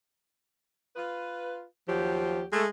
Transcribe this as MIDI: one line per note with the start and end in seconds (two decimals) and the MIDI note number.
0.96 1.64 65
0.96 1.64 71
1.88 2.46 39
1.88 2.43 53
1.88 2.46 54
1.88 2.46 67
2.53 2.68 56
2.53 2.64 57